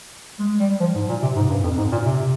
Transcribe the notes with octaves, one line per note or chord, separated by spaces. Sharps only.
G#3
G3
F3
G#2
A#2
C3
G#2
G2
F2
G#2
A#2
C3